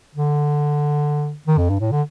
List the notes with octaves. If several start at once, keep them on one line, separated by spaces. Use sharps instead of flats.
D3
D#3
F2
G2
A2
D3